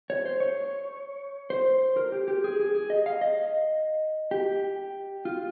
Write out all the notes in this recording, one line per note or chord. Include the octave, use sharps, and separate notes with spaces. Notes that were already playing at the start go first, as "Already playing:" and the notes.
C#5
C5
C#5
C5
A#4
G4
G4
G#4
G#4
G#4
D#5
F5
D#5
G4
F4